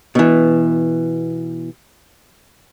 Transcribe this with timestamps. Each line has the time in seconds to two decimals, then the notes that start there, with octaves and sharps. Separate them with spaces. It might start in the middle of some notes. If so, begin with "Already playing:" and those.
0.15 B2 E3